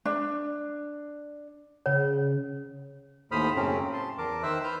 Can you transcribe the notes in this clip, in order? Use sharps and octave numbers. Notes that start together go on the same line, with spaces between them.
D4
C#3 C#5
D#2 A2 C5 B5 D#6 F6
F#2 A2 C#3 F#3 C4 C#4
A5 C6
E2 A#4 A5 D6
D#3 C5 E5 E6 F#6
B4 F6 G6